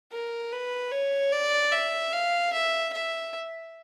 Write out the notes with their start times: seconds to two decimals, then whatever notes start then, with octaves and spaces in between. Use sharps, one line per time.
0.12 A#4
0.52 B4
0.91 C#5
1.32 D5
1.72 E5
2.13 F5
2.53 E5
2.93 E5